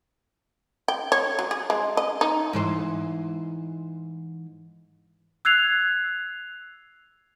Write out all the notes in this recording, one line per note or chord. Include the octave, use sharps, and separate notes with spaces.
G5
C#5
F#3
G#4
G#3
D#5
D#4
G#2 E3 C5
E6 F#6 G#6 C7 F7